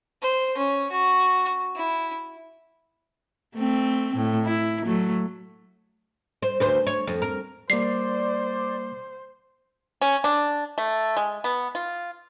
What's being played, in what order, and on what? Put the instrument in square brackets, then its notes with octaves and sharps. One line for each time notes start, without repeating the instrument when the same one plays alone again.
[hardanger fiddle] C5
C#4
F#4
E4
[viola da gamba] A3 C4
A2
E4
F#3 A3
[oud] C5
D2 B4 C5
C#5
F2
A#4
[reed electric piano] G3 A#3 [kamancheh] C5 [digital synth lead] D5 [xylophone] C7
[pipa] C#4
D4
A3
G#3
B3
F4